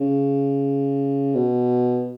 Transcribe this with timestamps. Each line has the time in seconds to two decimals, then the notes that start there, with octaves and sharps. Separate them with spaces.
0.01 C#3
1.35 B2